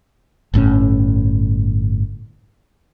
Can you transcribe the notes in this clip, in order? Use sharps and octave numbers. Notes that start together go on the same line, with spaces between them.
G1 A2 D3 C#4